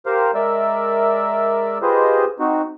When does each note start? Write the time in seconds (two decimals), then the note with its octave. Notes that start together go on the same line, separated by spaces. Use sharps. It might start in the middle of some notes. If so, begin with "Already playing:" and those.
0.06 G4 A#4 C5 F5
0.34 G#3 A#4 D5 E5
1.82 F4 G4 G#4 B4 C5 D#5
2.40 C4 D#4 F#4